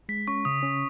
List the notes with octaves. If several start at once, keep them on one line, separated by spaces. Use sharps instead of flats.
G#3 B6
C#4 C#6
C#3 D#6
C#4